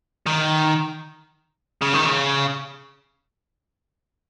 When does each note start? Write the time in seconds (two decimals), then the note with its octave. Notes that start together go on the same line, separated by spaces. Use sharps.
0.27 D#3
1.82 C#3
1.94 D#3
2.06 C#3